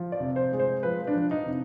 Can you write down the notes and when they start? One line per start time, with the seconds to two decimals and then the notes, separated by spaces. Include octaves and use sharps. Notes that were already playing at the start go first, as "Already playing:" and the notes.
Already playing: F3
0.12 D5
0.20 C3
0.36 C5
0.52 G#3
0.59 C5
0.83 F3 B4
1.07 D4
1.14 F3
1.31 D#4
1.46 C3